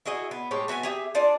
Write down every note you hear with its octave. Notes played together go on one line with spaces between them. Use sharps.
E4 F#4 G#4 D#5
B3
A2 G#3 G4 C#5
B3 F#4 E5 G#5
G4 G#4 E5
D4 F4 D5